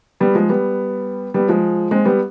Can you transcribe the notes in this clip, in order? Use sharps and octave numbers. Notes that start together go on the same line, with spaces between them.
G3 B3
F3 G#3
G3 B3
G3 B3
F3 G#3
G#3 C4
G3 B3